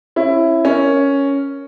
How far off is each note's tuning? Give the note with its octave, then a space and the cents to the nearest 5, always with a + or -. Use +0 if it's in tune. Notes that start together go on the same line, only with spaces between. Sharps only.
C#4 -35 E4 +10
C#4 +0 A#4 +0